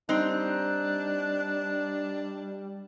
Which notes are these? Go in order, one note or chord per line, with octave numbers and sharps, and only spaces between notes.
G3 C4 D4 D#4 F#6